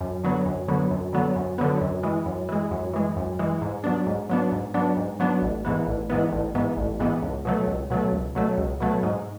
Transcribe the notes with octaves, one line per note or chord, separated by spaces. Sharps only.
F#2
D3 F#3 B3
F#2
D3 F#3 B3
F#2
D3 F#3 B3
F#2
D3 F#3 B3
F#2
E3 G#3
F#2
E3 G#3
F#2
E3 G#3
F#2
E3 G#3
G#2
F#3 B3 D4
G#2
F#3 B3 D4
G#2
F#3 B3 D4
G#2
F#3 B3 D4
A1
G#2 E3 B3
A1
G#2 E3 B3
A1
G#2 E3 B3
A1
G#2 E3 B3
C#2
B2 F#3 A3
C#2
B2 F#3 A3
C#2
B2 F#3 A3
C#2
B2 F#3 A3
G#2